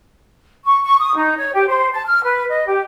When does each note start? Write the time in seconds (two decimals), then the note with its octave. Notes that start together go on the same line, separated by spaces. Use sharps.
0.64 C#6
0.83 C#6
0.99 D#6
1.15 D#4
1.37 C#5
1.54 G4
1.66 C5
1.92 A5
2.06 F6
2.24 B4
2.48 D#5
2.67 G4